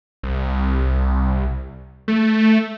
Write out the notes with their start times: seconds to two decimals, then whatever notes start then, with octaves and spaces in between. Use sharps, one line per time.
0.23 C2
2.08 A3